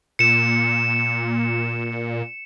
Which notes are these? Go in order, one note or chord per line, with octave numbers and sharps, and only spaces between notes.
A#2 C#7 E7